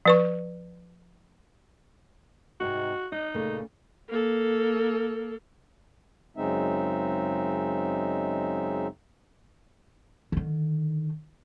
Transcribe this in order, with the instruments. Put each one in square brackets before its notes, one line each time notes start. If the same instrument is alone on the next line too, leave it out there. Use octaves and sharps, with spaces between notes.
[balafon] F3 B4 C#6
[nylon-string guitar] G#2 C3 D#4 [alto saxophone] F#4
[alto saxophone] D#4 [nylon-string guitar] D#5
[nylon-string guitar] A#2 C#3 A3
[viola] A#3 A4
[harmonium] F#2 C#3 G#3 C4 D#4 E5
[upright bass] D3 D#3